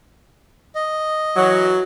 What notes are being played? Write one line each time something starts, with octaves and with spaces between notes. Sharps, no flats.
D#5
E3 F#3